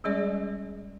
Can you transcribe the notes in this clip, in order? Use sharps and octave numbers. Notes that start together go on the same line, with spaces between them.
G3 G#3 C#4 G#4 D5 D#5